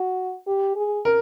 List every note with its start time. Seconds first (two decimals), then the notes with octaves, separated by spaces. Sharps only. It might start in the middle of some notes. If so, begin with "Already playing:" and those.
Already playing: F#4
0.47 G4
0.76 G#4
1.05 A#4